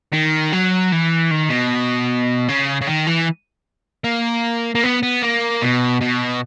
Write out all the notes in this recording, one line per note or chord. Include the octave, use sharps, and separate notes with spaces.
D#3
F#3
E3
D#3
B2
C#3
C#3
D#3
E3
A#3
A#3
B3
B3
A#3
B2
B2